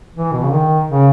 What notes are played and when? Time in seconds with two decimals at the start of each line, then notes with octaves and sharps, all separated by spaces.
0.16 E3
0.33 B2
0.43 C#3
0.53 D#3
0.90 C#3